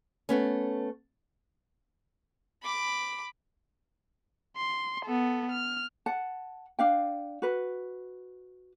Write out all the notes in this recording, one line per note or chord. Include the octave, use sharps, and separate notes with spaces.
A3 B3 C#4
B5 D6
C6
B3 A4
F6
F#5 A5
D4 F5 G5
F#4 B4